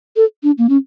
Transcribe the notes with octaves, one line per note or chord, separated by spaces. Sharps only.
A4
D4
A#3
C#4